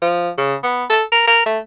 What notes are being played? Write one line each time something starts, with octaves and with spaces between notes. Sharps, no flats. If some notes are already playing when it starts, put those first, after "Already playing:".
F3
C#3
B3
A4
A#4
A#4
A3